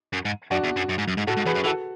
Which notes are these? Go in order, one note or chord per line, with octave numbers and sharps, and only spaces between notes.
F#2
G#2
F#2 D4 F#4
E2
F#2
F#2
G#2
F#2
G#2
A2 F#4 A4
G#2
E2 G#4 B4
F#2
E3 F#4 A4